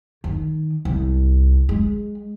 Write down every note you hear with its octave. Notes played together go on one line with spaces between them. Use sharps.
D#3
C2
G#3